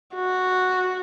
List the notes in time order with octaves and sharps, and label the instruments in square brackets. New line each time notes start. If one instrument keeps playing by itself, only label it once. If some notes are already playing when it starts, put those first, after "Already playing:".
[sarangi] F#4